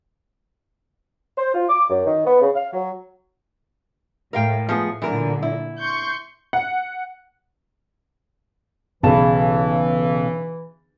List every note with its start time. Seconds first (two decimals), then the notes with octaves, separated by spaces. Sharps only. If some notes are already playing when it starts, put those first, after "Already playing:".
1.37 C5
1.54 F4
1.69 D6
1.90 F#2
2.06 D#3
2.26 B3
2.41 C#3
2.55 F5
2.73 F#3
4.33 A2 A#4 F5 G5
4.69 F3 B3 G#4
5.02 A#2 D3 E3 F#3 A#4
5.42 E4
5.78 C6 C#6 G6
6.53 F#5
9.03 B1 C#3 E3 A5 E7